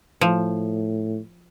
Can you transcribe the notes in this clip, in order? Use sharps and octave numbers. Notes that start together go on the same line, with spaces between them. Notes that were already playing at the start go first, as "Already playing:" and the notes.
A2 F3